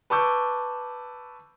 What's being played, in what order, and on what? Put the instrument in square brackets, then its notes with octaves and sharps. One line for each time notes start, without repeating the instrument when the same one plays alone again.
[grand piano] B4 A5 C#6 D6 E6 G6